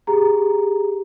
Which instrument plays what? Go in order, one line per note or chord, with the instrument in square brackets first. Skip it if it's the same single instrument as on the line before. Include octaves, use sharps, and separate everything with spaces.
[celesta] G4 G#4 A#5